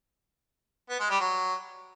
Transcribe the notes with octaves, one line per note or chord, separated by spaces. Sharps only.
B3
G#3
G3
F#3